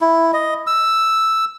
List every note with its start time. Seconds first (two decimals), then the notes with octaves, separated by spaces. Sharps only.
0.01 E4
0.33 D#5
0.67 E6